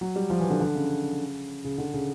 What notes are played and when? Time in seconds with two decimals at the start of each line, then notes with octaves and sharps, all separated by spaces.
0.01 F#3
0.16 G3
0.30 F3
0.40 E3
0.50 D3
0.60 D3
0.75 C#3
1.65 C#3
1.78 D3
1.94 C#3